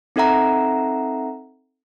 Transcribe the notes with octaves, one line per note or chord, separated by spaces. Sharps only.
C4 D#4 A4 E5 F#5 A#5